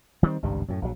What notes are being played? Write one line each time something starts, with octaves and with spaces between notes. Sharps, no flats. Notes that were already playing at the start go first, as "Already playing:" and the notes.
D#3 G3 A3 C4
G#1 C#2 G2 G3
F#2 A2
A#1 G2 F#3